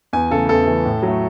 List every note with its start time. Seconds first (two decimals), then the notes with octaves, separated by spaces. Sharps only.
0.13 E2 G#5
0.31 C#3 E3 A3 A4
0.49 E2 A4
0.67 C#3 E3 A3
0.85 A2
1.02 F#3
1.08 A3